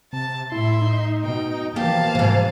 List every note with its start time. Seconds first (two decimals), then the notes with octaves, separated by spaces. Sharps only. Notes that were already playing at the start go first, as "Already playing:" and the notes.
0.13 C3 A5
0.52 A2 E4 E5 C6
0.81 D#4
1.24 B2 G5
1.76 B2 E3 F3 A#3 G4 F5 A5
2.15 G#2 C3